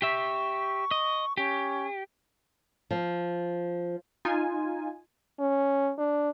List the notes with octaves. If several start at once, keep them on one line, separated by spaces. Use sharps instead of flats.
G4 E5 C#6
D#5
C#4 G4
F3
D#4 F4 G#5
C#4
D4